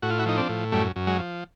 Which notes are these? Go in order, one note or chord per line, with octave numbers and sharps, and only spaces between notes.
A2 F#4
F4
E4 F#4
F3 D#4
C4 D4
A2
F#2 G3 A3
F#2
F#3 G#3
F3